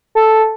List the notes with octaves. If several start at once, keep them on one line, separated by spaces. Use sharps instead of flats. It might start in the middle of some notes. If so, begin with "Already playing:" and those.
A4